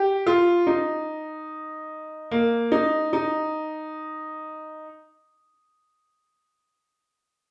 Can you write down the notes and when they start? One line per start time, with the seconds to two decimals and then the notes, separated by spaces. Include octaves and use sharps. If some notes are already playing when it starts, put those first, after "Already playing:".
Already playing: G4
0.27 F4
0.67 D#4
2.31 A#3
2.72 D#4
3.13 D#4